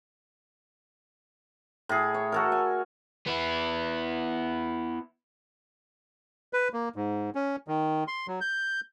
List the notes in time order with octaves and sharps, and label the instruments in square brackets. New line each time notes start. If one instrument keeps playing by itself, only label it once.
[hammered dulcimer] A2 G#4
C#5
F#4 A4 A#4
G#5
[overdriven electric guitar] B3 E4
[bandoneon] B4
A#3
G#2
C#4
D#3
C6
F#3
G6